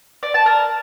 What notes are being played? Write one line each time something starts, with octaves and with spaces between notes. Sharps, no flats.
D5
A5
A#4